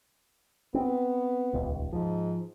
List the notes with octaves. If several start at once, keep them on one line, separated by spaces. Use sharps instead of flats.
B3 C4
D#1 C#2
G#2 F3